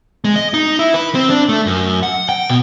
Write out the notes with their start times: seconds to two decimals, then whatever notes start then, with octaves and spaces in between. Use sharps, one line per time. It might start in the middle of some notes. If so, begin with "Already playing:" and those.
0.24 G#3
0.36 D#5
0.54 D#4
0.79 E4
0.94 B4
1.15 C4
1.30 D4
1.49 A3
1.66 F#2
2.03 F#5
2.29 G5
2.49 B2